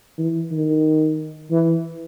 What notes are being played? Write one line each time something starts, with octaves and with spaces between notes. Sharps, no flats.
E3
D#3
E3